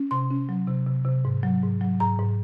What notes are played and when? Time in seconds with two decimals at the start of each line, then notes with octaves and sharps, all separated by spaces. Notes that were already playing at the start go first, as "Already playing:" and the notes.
Already playing: C#4
0.11 C3 C6
0.30 C#4
0.49 F#3
0.67 C3
0.86 C3
1.05 C3
1.25 G#2
1.43 F#3
1.63 G#2
1.81 F#3
2.00 G#2 A#5
2.19 G#2